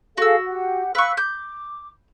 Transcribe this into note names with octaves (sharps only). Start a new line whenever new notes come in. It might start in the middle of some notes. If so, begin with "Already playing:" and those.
F#4 G#4 A4 F5 E6
G4 F#5
B4 F5 C#6 E6 F#6
D6 G6